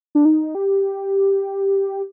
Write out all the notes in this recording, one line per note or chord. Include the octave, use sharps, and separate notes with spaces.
D4
D#4
G4